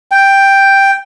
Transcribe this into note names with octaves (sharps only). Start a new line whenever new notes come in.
G5